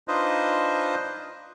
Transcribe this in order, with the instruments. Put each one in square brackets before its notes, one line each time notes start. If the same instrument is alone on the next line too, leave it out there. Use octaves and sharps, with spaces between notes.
[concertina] D4 D#4 F4 B4 C5 D#5